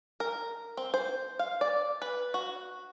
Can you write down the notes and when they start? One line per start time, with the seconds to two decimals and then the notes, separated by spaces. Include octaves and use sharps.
0.20 A#4
0.77 C4
0.94 C5
1.39 F5
1.61 D5
2.02 B4
2.34 F#4